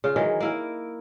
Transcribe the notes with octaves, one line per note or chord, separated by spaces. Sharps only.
C#3 F4
D#3 E3 F#3 G#3
A#3 E4 A#4